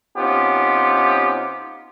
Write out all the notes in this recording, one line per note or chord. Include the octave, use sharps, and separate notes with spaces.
C3 B3 C#4 D#4 F4 G4